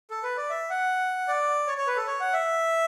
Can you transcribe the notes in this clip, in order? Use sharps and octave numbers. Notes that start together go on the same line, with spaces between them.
A4
B4
D5
E5
F#5
D5
C#5
C#5
B4
A4
C#5
F#5
E5